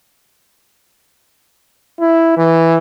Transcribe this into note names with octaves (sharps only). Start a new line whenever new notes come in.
E4
E3